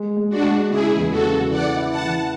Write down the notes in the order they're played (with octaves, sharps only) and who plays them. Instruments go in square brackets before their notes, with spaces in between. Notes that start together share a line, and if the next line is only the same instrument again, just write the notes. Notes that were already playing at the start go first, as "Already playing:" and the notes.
Already playing: [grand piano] G#3
G#3
[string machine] D4 F#4
[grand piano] G#3
[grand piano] C#3 [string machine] E4 G#4
[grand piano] E2
[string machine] F#4 A4
[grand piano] C#3
[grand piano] E3 [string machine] D5 F#5
[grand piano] E4
[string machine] F#5 A5
[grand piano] E3